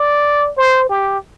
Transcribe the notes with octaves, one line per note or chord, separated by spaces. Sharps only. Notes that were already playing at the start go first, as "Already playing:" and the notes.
Already playing: D5
C5
G4